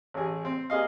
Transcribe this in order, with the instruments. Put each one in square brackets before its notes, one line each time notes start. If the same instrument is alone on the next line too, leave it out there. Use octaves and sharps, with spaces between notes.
[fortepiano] A1 G#4
C4
A#3 G#4 D#5 F5